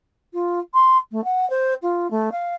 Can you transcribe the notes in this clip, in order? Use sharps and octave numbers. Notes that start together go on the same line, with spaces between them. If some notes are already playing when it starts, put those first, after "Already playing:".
F4
C6
A3
F#5
C5
F4
A3
F5